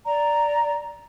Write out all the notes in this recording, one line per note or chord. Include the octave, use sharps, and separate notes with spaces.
D5 A#5